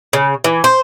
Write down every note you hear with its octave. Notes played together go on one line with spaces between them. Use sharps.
C#3
E3
C5